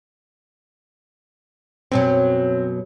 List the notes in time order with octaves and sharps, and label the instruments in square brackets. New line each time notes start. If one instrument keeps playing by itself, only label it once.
[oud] F#2 B2 F#3 [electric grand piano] C4